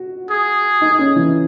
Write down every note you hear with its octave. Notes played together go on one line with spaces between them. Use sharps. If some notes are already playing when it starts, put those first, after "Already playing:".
Already playing: F#4
G#4
D#4
C#4
E3